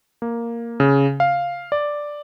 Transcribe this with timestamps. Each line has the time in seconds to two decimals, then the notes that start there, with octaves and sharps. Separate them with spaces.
0.22 A#3
0.80 C#3
1.20 F5
1.72 D5